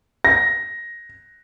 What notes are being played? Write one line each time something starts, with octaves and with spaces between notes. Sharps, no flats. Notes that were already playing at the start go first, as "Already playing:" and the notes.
A#6